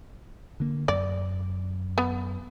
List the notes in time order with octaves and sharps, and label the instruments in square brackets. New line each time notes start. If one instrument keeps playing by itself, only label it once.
[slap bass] D3 A#3
[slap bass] F#2 [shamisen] D5
[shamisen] B3